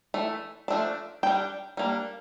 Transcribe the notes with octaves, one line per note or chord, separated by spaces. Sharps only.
E3 A3
F3 A3 D4
G3 D4 G5
G3 A#3 D4